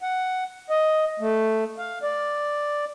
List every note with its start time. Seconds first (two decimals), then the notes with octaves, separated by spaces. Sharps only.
0.02 F#5
0.70 D#5
1.20 A3
1.78 F5
2.03 D5